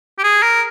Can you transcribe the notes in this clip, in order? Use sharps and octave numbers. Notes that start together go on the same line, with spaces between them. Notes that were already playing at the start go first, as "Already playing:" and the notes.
G4
G#4
A#4